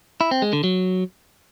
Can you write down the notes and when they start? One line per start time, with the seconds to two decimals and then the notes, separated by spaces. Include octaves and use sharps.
0.21 E4
0.31 C4
0.42 G#3
0.53 D3
0.64 F#3